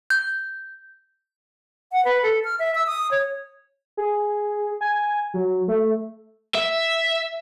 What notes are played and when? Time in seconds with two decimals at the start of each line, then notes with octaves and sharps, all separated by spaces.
0.10 G6
1.92 F#5
2.05 B4
2.23 A4
2.44 F6
2.59 E5
2.75 E6
2.87 D#6
3.11 C#5
3.97 G#4
4.81 G#5
5.34 F#3
5.68 A3
6.55 E5